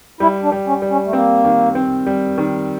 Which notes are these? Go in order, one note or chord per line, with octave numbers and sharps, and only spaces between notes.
G3 E4
D4
G3
C#4
G3
C#4
A3
A#3 C4
D#3
C4
G3
D#3